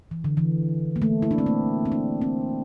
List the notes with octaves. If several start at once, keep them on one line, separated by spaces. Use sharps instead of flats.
E3
D3
E3
A#3
A3
E4
D4
C4
A#3
C4
D4
C4